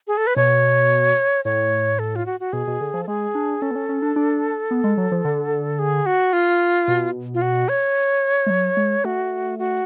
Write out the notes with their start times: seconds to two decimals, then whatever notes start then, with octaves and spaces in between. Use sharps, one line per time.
0.08 G#4
0.17 A4
0.27 B4
0.36 B2 C#5
1.45 A2 C#5
1.99 A4
2.16 F4
2.26 F#4
2.40 F#4
2.53 B2 G#4
2.67 B2
2.81 D3
2.94 F3
3.03 A4
3.08 G#3 G#4
3.35 D4
3.62 C#4 A4
3.71 B3
3.75 C#4
3.89 C#4
4.02 D4
4.16 D4
4.71 B3
4.84 G#3
4.97 F#3
5.12 F3
5.25 D3
5.79 G#4
6.06 F#4
6.33 F4
6.88 B2
7.34 F4
7.42 F#4
7.69 C#5
8.46 G#3
8.50 F#3
8.77 G#3
9.05 A3 F#4
9.59 F#4